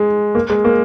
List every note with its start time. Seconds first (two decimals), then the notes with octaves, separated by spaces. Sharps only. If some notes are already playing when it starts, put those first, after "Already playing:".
Already playing: G#3
0.35 A#3
0.50 G#3
0.64 A#3